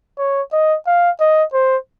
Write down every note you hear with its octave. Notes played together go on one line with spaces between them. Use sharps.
C#5
D#5
F5
D#5
C5